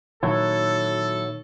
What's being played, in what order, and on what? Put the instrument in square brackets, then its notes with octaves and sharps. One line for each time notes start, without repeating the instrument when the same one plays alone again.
[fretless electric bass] A#2 D#3 [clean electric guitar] F#3 E4 [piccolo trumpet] A4 [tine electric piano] C#5